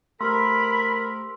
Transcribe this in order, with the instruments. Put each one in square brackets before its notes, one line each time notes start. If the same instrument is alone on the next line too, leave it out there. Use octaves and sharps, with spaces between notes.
[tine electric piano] A3 G4 C5 [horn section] A#4 [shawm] B5 [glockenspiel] C6 E6